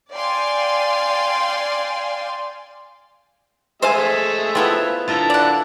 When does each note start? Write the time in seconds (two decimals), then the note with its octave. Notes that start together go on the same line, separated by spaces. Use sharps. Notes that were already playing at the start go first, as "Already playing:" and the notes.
0.13 D5 F5 G5 G#5 C6
3.82 G#3 A3 C5 E5 F5 G#5
4.55 B3 C4 E4 F4 A4 C#5
5.08 D3 E4 F4 A4 A#4
5.30 D5 F#5